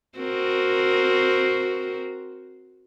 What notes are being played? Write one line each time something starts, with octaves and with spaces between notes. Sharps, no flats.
C4 F#4 A#4